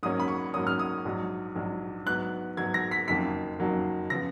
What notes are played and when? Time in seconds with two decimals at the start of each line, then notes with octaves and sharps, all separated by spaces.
0.03 G#2 F#3 A#3 C#4 D#6
0.20 B5
0.28 C#6
0.54 G#2 F#3 A#3 C#4 D#6
0.67 F6
0.79 D#6
1.05 A#1 G#2 F#3
1.55 A#1 G#2 F#3
2.06 G#2 F#3 B3 F#6
2.57 G#2 F#3 B3 G#6
2.74 A#6
2.91 B6
3.08 F#1 F2 D#3 F#3 A#3 B6
3.59 F#1 F2 D#3 F#3 A#3
4.10 C#3 F3 B3 A#6